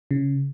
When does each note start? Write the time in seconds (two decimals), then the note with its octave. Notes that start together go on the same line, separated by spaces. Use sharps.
0.11 C#3